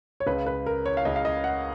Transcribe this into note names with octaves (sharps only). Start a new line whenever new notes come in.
C#5
C#2 C#3 B4
B4
A#4
C#5
F5
C#2 C#3 D#5
F5
D#5
F#5